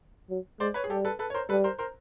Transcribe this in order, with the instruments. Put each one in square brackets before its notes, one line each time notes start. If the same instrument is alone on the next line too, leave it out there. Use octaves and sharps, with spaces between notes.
[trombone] F#3
[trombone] G#3 [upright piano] C5 D5
[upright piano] B4 C#5
G#4
[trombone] G3 [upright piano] G4 A4
[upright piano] A4 B4
A4 B4
C#5
A#4 C5
[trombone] G3 [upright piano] A4 B4
[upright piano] A#4 C5
A#4 C5